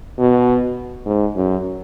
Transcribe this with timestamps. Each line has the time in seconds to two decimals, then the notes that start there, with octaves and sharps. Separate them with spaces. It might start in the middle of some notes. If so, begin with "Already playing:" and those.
0.19 B2
1.06 G#2
1.36 F#2